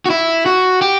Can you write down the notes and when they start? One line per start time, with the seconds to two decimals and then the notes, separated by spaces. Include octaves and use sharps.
0.06 F#4
0.10 E4
0.46 F#4
0.82 G4